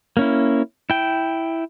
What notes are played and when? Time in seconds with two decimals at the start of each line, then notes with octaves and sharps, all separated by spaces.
0.17 A#3 C#4 E4
0.90 E4 G5